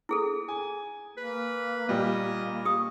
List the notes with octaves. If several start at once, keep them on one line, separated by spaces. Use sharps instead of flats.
E4 G#4 A4
G#5
A#3 B4
A#2 G3 A#3 D#5
G4 D#6